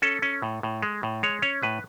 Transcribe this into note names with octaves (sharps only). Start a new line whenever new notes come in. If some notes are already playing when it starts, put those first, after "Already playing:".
C#4 A4
C#4
A2
A2
G#3
A2
G#3 C#5
C#4 C#5
A2 B4